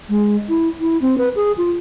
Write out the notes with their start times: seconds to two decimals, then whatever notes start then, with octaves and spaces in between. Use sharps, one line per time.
0.09 G#3
0.49 E4
0.80 E4
1.01 C4
1.18 B4
1.36 G#4
1.57 F4